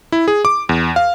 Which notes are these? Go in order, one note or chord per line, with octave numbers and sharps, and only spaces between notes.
E4
G#4
D6
E2
F5